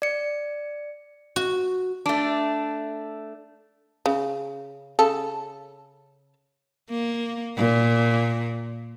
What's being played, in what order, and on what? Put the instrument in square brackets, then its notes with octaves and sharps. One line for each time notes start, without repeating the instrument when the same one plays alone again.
[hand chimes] D5 C#7
[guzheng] F#4
[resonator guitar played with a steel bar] A3 D4
[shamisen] C#3
C#3 A4 A5
[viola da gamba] A#3
A#2